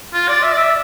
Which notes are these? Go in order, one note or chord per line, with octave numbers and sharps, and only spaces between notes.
F4
D5
E5
D5
E5